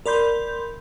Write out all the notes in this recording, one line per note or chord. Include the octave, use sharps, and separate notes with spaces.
A#4 D5 B5 C6 G6